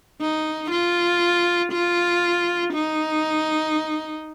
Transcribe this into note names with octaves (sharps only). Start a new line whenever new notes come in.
D#4
F4
F4
D#4